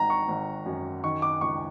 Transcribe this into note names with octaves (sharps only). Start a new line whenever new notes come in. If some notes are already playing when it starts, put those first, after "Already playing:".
Already playing: G#1 D#3 A#5
C#6
G#1
F#2
D#3 C#6
D6
C#2 C#6